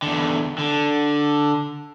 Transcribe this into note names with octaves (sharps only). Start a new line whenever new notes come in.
E2 D3
D3